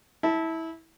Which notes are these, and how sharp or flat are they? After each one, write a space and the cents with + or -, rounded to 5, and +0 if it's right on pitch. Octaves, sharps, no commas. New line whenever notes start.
E4 -20 A5 +0